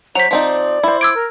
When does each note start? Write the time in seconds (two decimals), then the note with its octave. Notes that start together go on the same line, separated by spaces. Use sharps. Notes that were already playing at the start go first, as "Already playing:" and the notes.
0.15 F#3 C5 B6 F7
0.31 F3 C4 D#4 D5
0.83 E4 C5
1.01 D6 E6 G#6 D7
1.15 A#4